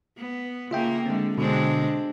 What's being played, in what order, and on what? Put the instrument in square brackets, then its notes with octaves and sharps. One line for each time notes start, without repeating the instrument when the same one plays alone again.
[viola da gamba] B3
[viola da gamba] C#3 A#3 [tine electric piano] F4 E5 G5
[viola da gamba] D3 [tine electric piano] G#3 C4
[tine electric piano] B2 D3 [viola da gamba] G#3 C4 D4